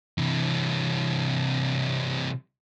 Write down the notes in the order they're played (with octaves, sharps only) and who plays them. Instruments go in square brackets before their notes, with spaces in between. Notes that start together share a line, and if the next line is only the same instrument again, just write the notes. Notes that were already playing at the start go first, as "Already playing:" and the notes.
[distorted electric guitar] C3 E3